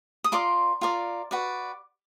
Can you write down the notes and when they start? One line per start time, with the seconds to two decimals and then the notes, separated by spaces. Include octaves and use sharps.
0.24 D#6
0.32 F4 A#4 D5 C6 D6
0.81 F4 A#4 D5
1.31 F#4 B4 D5